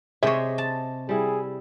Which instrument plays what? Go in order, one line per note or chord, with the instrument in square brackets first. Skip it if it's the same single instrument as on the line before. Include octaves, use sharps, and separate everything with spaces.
[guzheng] C3 C#5 [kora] G#4 C5 D#5 [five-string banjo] E5
[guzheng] A5
[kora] G3 E4 [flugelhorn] G#4